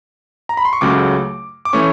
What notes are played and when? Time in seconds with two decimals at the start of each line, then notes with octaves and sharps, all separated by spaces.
0.49 A#5
0.57 B5
0.65 C6
0.73 C#6
0.81 C#2 C#3 F#3 A3 D6
1.65 D6
1.73 E3 A3 C#4 C#6